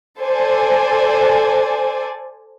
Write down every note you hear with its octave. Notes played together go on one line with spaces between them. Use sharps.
A4 C5 D5 G#5